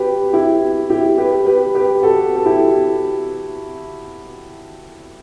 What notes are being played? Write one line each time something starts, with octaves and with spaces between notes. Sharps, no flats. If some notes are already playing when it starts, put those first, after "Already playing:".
Already playing: F#4 G4 B4
E4 G4
E4 G4
G4 B4
G4 B4
G4 B4
F#4 A4
A4
E4 G4